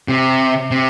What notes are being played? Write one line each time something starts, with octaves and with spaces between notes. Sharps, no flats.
C3
C3